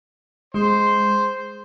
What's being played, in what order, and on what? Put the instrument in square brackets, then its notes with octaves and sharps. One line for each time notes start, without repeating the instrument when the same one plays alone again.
[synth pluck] G#3 [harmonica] C5